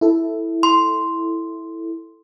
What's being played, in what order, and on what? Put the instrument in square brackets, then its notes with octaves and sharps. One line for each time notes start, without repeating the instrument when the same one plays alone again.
[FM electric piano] E4 A4
[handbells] C6